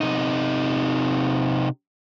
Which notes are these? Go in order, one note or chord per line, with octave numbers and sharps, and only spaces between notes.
C3 D#4